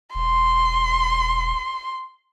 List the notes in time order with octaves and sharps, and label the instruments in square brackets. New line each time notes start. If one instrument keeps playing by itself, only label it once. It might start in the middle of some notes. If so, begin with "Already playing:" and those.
[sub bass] E1 [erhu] C6